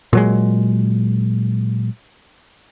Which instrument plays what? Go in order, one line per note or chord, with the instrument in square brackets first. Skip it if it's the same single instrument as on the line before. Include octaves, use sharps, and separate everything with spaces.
[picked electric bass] A#2 F#3 G#3